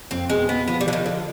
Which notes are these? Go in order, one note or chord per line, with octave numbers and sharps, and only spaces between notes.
F2 C4
B2 G#3
B2 B3
F3 B3
G3
D3 F3
D#3
D3 F3